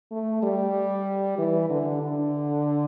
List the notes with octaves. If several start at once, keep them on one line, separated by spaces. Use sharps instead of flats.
A3
G3
E3
D3
D3